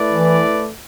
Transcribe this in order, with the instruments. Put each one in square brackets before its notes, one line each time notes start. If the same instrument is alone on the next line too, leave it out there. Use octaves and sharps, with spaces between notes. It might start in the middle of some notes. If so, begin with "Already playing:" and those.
Already playing: [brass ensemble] A3 E4 B4 D5
[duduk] E3